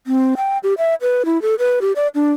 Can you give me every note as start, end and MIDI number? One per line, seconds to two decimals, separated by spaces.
0.07 0.34 60
0.37 0.58 79
0.64 0.74 67
0.78 0.95 76
1.02 1.25 71
1.25 1.41 64
1.42 1.55 69
1.59 1.79 71
1.81 1.92 67
1.96 2.08 74
2.15 2.32 62